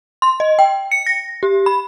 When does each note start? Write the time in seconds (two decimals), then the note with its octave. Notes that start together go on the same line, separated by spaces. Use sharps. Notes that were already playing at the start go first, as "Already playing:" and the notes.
0.22 C6
0.40 D#5
0.59 G5
0.91 C#7
1.06 A#6
1.43 G4
1.66 B5